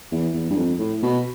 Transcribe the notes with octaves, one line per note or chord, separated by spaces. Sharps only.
E2
E2
G2
F2
A2
B2